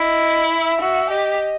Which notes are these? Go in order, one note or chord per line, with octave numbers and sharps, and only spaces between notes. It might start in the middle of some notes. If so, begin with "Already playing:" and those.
Already playing: E4 D#5
E5
F#4 E5
G4 D#5